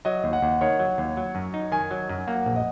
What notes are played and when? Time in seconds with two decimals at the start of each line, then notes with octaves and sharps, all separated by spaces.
0.05 F#3 D#5
0.24 D#2
0.33 F#5
0.42 D#2
0.61 D#3 C#5
0.79 F#3
0.98 D#2
1.17 F#3
1.35 F#2
1.54 D#4
1.72 D#3 G#5
1.91 F#3
2.09 F#2
2.27 A#3 F#5
2.46 A#1
2.56 D#5